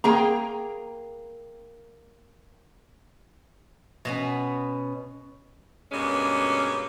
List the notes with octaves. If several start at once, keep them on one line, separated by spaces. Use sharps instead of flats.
A#3 G#4 G5 A#5
B2 B3 C#4
G2 B2 G#3 A#3 C#4